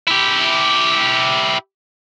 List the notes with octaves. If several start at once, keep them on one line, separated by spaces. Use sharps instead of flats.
E4 G4